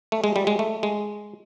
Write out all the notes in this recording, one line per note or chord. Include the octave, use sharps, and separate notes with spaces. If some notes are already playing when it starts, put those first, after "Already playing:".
A3
G#3
G3
G#3
A3
G#3